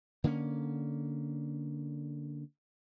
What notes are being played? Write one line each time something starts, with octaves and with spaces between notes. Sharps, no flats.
D3 A#3 B3 C#4